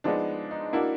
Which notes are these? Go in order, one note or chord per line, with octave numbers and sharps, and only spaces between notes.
F3 G#3 B3 D4 D#4
D#4
A#3 D4 E4 F#4